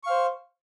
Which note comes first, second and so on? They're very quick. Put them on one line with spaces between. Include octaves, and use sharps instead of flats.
C#6 F5 C5